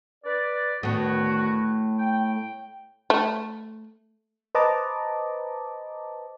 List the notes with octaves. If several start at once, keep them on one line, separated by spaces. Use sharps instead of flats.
B4 D5
D2 A2 D#3 B3 F#4
G5
A3
B4 C5 D#5 A5 A#5 D6